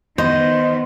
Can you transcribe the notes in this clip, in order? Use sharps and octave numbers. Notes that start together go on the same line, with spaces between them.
D#3 B3 C5 D#5